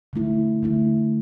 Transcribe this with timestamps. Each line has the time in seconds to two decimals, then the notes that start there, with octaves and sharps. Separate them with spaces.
0.13 D3 A3 E4
0.63 D3 A3 E4